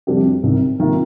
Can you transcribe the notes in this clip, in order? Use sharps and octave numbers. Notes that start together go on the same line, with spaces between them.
F2 C3 G3 D4 G4
C2 C3 D#3
C3 D#3 A#3 F4